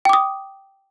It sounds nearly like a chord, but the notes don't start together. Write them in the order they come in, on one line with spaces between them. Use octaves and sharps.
G5 D6 D#6